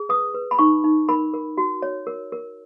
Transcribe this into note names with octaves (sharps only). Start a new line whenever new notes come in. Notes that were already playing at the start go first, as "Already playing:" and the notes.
Already playing: G#4
B4 D#6
B4
B5
D#4 C#6
D#4
A#4 B5
A#4
F#4
C#5
A#4
A#4